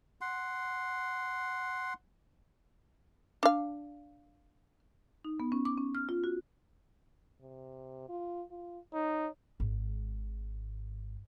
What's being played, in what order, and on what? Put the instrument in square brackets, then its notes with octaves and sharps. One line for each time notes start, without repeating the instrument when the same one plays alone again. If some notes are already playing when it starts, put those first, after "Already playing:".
[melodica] F#5 C6
[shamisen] D4 F5
[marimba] D#4
B3
C#4
D6
C#4
F6
F4
F#4
[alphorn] C3
F4
F4
[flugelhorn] D#4 [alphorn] C#5
[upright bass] G#1 G#2